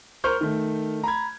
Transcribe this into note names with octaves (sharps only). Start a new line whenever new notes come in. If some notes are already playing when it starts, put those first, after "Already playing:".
A#4 C5 C#6 F6 G6
D#3 A3
A#5 B5 G#6